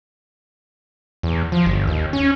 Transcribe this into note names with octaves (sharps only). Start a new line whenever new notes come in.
E2
F3
G1
D#2
C#4